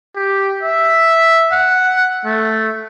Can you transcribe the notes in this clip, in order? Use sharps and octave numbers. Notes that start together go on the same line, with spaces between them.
G4
E5
F#5
A3